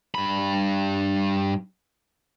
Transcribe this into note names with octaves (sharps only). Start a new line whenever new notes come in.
G2 B5